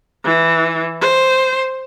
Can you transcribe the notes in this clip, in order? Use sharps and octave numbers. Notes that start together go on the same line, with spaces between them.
E3
C5